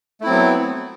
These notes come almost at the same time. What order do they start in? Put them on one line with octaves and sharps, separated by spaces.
A3 E4 C4 F#3 B3